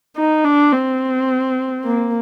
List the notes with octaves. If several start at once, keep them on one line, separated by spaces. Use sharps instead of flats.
D#4
D4
C4
A#3